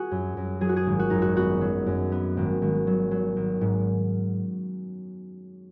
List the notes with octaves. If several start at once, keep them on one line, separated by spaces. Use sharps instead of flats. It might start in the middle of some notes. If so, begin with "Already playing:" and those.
Already playing: F#4 G#4
F#2
F#2
F#3 G#4
F#4
G#4
G#1
F#4
F#2 D#4
F#4
B3 F#4
F#3
F#2
B3
G#1
G#1
F#3
F#3
G#1
G#2